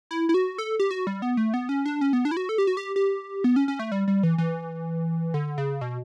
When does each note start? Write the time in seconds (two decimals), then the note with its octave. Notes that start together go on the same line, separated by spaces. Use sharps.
0.11 E4
0.29 E4
0.34 F#4
0.58 A4
0.80 G4
0.91 F#4
1.07 G3
1.22 B3
1.37 A3
1.54 B3
1.69 C#4
1.86 D4
2.01 C#4
2.13 B3
2.25 D4
2.31 E4
2.37 F#4
2.49 A4
2.58 G4
2.67 F#4
2.77 G4
2.96 G4
3.44 B3
3.56 C#4
3.68 C#4
3.79 A3
3.92 G3
4.08 G3
4.23 E3
4.38 E3
5.34 D3
5.58 C#3
5.81 B2